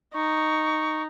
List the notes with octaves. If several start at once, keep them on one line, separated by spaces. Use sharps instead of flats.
D#4 C#6